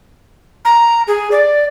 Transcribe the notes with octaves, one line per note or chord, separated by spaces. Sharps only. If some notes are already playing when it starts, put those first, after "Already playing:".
A#5
G#4
D5